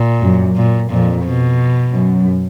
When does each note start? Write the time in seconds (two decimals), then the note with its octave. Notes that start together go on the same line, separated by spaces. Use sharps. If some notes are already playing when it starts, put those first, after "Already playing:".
Already playing: A#2
0.21 F#2
0.56 A#2
0.89 F2 A#2
1.25 B2
1.93 F#2